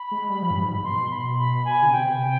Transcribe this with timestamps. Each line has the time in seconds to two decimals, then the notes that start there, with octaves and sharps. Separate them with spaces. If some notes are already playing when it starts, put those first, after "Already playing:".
Already playing: B5
0.12 G#3
0.29 G3
0.42 F3
0.51 G2
0.57 G#2
0.83 B2 C6
1.11 B5
1.38 B5
1.65 G#5
1.82 D3
1.92 C3 G5